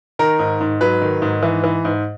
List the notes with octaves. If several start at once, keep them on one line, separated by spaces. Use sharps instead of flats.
D#3 A#4
G#2
G#2
F#3 B4
D#3
G#2
E3
E3
G#2